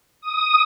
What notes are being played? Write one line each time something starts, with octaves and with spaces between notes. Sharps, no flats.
D#6